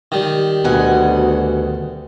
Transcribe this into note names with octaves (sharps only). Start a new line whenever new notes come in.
D#3 G3
D2 B2 F#5 G#5